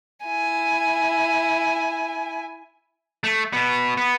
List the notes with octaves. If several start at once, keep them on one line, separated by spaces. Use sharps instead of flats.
E4 G#5
A3
B2 B3
B3